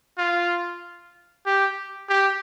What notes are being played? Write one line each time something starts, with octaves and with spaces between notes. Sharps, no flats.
F4
G4
G4